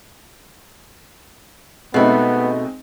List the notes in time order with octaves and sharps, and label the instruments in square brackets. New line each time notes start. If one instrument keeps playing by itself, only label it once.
[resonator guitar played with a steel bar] B2 A3 [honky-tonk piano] G#3 C4 D#4 [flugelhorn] B3